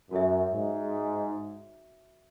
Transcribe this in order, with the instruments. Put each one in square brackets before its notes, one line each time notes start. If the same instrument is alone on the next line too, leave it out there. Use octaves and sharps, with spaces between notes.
[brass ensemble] F#2 [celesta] F#4 A4 C#5 E5
[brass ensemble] G#2